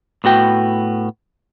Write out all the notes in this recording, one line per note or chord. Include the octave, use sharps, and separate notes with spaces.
A2 B3 F#4 G5